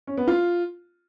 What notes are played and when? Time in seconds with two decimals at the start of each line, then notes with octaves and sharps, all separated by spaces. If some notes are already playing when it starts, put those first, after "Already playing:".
0.07 C#4
0.17 B3
0.28 F4